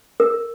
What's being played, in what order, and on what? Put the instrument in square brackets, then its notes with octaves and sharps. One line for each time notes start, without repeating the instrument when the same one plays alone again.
[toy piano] A#4